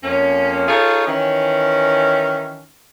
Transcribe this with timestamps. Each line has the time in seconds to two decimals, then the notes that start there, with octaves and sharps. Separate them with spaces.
0.04 F2 A#3 C#4
0.68 D#4 F4 G#4 A4 C#5
1.07 D#3 E3 C#4